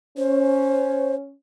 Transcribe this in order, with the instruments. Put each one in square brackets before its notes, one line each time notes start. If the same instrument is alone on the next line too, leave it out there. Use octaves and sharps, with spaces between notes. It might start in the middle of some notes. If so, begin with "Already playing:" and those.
[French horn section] C#4 [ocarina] C5